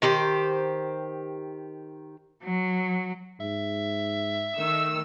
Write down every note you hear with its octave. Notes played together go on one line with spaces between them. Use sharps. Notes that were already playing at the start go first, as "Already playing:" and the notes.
D#3 G4 C5
F#3
G#2 E5
D#3 A3 E6